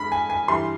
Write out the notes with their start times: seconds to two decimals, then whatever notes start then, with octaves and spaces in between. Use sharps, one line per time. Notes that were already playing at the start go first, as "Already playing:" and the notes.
Already playing: G2 G#3 B5
0.12 G#5
0.30 G#5
0.48 G2 E3 G3 C6